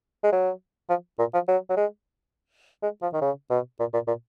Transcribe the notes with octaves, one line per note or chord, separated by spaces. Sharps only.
G#3
F#3
F3
A#2
F3
F#3
F#3
G#3
G#3
F3
D#3
C#3
B2
A#2
A#2
A#2